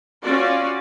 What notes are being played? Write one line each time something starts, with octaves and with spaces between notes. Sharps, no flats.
C#4 F4 F#4 D5